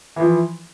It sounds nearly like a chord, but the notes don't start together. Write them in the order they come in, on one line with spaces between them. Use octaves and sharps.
E3 F3 E4